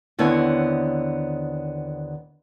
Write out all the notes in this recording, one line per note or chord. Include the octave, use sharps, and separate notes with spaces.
D#2 D3 B3 C4 E4 C#5